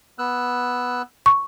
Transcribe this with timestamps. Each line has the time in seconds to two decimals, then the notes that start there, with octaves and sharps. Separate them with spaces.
0.19 B3 E6 F#6
1.26 C#6